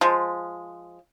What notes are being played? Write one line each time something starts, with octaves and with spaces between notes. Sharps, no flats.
F3 G#3